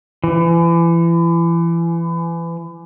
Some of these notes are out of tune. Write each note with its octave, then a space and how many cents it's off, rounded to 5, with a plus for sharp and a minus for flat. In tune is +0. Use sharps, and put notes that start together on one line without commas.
E3 +30